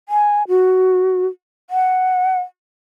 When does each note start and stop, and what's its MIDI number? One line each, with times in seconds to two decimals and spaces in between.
0.09 0.43 80
0.48 1.27 66
1.70 2.39 78